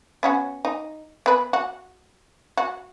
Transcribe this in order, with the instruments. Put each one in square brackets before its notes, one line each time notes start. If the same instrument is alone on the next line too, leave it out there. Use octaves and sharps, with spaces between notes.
[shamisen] B3 C#4 F#4
D#4
B3 B4
F#4
F#4